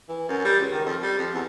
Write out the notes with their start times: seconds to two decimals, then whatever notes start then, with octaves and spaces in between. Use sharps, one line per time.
0.09 E3
0.29 F#2
0.45 G3
0.60 C#2
0.72 D#3
0.85 F2
1.02 G3
1.18 F2
1.34 E2